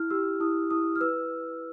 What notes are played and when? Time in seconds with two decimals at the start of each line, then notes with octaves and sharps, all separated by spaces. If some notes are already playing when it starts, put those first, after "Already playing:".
Already playing: E4 F6
0.10 G4 E6
0.40 E4 D#6
0.70 E4 D#6
0.96 F6
1.01 B4 E6